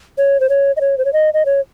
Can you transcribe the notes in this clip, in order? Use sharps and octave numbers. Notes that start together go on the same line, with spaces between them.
C#5
C5
C#5
D#5
C#5
C5
C#5
D#5
D#5
C#5